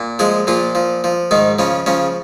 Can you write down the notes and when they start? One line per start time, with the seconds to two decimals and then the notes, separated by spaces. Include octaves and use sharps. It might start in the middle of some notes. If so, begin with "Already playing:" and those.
Already playing: A#2
0.19 F3 G#3 G#4
0.47 A#2 F3 F4
0.75 F3
1.04 F3
1.31 G#2 D#3 D#4
1.59 C#3 F3 C#4
1.86 C#3 F3 C#4